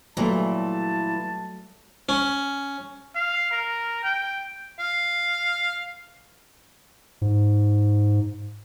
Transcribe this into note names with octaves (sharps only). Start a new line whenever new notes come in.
A#2 E3 F#3 G3 A3 A5
C#4
F5
A#4
G5
F5
G#2